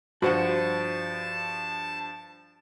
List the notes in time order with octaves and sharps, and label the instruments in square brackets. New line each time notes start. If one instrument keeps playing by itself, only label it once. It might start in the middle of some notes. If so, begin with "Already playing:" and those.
[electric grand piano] G2 F3 [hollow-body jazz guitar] F#4 C5 F#5 [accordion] A5